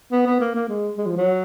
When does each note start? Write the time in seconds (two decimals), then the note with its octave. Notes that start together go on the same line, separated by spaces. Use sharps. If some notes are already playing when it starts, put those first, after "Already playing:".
0.12 B3
0.26 B3
0.40 A#3
0.55 A#3
0.69 G#3
0.98 G#3
1.06 F3
1.17 F#3